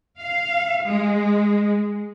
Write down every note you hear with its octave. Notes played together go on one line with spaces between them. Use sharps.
F5
G#3